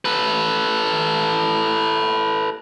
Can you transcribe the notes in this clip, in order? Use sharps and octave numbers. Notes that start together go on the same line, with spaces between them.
A4 B4